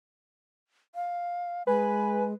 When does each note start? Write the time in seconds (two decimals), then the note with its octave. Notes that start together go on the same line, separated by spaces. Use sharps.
0.95 F5
1.67 G#3 B4 G#5